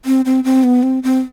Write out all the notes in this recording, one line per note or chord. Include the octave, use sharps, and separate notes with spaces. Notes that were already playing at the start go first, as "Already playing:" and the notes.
C4
C4
C4
B3
C4
C4